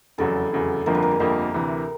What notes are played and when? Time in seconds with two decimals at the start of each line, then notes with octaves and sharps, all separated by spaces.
0.18 F1 E2 C#3 F#3 A4
0.51 F1 E2 C#3 F#3
0.86 G1 F2 D3 F3 A#3 A#4
0.95 B4
1.03 A#4
1.11 G#4
1.19 G1 F2 D3 F3 A#3 G4
1.54 D2 C3 E3